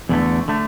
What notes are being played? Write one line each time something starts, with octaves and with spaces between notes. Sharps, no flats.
E2 D3 A3
D3 A3